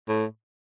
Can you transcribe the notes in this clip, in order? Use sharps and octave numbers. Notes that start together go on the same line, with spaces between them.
A2